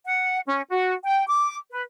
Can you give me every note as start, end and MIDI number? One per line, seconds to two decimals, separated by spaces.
0.05 0.40 78
0.46 0.62 61
0.70 0.92 66
1.04 1.26 79
1.29 1.56 86
1.71 1.82 71